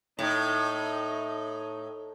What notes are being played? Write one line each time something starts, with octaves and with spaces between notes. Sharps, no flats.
A2 D#4